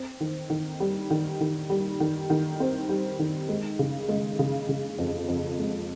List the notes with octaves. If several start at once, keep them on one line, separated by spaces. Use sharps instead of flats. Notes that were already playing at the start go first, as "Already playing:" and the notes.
Already playing: C4
D#3
D#3
G3
D#3
D#3
G3
D#3
D#3
C4
G3
D#3
G#3
C#3
G#3
C#3
C#3
F2
F2
G#3